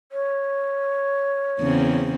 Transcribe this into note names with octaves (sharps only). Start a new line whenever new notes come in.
C#5
E2 C#3 C4